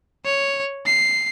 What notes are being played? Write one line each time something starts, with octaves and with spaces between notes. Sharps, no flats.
C#5
C7